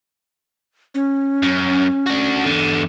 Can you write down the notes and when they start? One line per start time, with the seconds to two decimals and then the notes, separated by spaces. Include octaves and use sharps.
0.95 C#4
1.43 F#2
2.07 D4 F#4
2.45 E2 D3